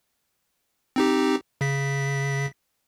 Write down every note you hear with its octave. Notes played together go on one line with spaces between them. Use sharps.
C4 D#4 G4
C#3 B6